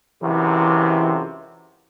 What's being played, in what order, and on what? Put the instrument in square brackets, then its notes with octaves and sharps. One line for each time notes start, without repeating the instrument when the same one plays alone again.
[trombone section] C#2 F#2 C3 [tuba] E3